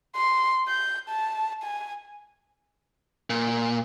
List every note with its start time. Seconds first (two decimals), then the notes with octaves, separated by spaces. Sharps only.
0.16 C6
0.68 G6
1.09 A5
1.63 G#5
3.30 A#2